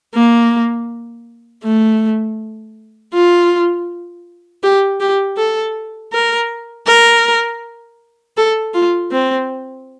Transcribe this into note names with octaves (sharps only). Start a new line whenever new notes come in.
A#3
A3
F4
G4
G4
A4
A#4
A#4
A4
F4
C4